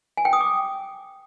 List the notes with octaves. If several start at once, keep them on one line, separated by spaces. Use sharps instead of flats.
G#5
G5
D#6
D6